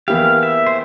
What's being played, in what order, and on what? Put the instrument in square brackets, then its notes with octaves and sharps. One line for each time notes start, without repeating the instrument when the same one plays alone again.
[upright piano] E2 E3 A#3 E4 G4 [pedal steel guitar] F5
[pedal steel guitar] E5
C5